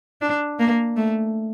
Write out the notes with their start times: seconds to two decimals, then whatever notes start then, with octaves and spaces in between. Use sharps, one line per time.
0.21 D4
0.59 A#3
0.97 A3